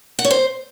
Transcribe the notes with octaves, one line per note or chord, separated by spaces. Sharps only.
F#5
C#5
C5